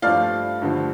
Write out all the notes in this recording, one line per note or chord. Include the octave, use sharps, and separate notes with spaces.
G2 F3 A3 D5 F5
G2 D3 F3 A3